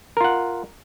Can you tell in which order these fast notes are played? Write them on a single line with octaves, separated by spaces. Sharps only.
A#4 F4 F#5